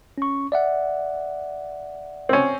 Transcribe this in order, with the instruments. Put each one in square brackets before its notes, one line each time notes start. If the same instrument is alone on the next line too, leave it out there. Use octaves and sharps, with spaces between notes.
[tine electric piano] C#4 C#6
D5 E5 F#5
[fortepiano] C4 C#4